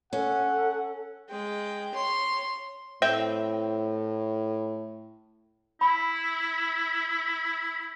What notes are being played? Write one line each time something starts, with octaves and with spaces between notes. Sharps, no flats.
C#4 A4 F#5
G#3 G5
C#5 C6
A2 C4 E5 G5
E4 B5